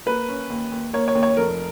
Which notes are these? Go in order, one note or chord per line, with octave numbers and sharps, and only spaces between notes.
A#3 B4
C#4
D#2
D#2
A#3 C#5
C#5
D#2
C#5
F1 A#4